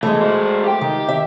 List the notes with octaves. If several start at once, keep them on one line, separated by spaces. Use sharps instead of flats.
E3 G#3 A3
F#3 C5
G4 G5
D#3
E5